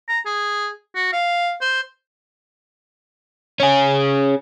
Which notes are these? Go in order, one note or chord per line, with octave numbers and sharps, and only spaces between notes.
A#5
G#4
F#4
F5
C5
C#4 G#4